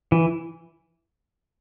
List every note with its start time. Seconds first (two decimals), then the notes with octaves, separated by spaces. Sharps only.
0.12 E3